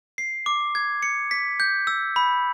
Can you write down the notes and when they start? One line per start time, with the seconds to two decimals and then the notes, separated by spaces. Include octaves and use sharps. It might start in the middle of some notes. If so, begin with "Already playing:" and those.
0.18 C7
0.46 D6
0.75 G#6
1.03 C#7
1.31 B6
1.60 G6
1.87 E6
2.16 B5